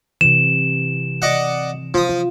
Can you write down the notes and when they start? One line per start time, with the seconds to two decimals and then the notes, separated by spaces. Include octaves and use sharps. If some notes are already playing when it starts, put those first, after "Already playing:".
0.21 C3 E3 E7
1.22 D5 D#5 F#5
1.94 F3 F4 D#6
2.09 F4